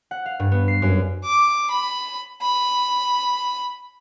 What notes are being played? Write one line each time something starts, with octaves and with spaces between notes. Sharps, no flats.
F#5
F5
G2
B3
C7
F#2
D6
B5
B5